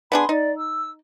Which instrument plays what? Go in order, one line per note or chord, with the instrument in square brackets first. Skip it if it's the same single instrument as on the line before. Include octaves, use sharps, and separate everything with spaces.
[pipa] B3 D4 G#4 [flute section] B5 C6
[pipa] D#4 [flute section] D5
[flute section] E6